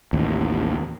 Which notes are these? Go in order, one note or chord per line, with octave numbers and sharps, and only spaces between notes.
A1 D#2